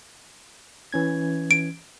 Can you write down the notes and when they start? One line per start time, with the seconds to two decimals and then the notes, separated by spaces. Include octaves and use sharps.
0.93 E3 C#4 G#6
1.51 D7